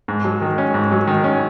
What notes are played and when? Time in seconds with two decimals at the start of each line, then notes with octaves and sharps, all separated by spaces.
0.08 G#2
0.24 F#3
0.41 D#3
0.58 C#4
0.74 G#2
0.91 F#3
1.07 D#3
1.24 C#4